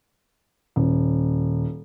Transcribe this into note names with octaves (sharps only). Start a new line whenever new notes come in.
D#1